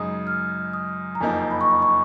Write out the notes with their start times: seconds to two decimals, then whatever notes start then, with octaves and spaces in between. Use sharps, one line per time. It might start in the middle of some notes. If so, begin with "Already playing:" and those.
Already playing: F#2 C#3 G#3 D#4 D#6
0.27 F6
0.73 D#6
1.15 A#5
1.20 F#1 F2 F3 A#3 D#4 G#5
1.51 B5
1.61 C#6
1.71 B5
1.82 C#6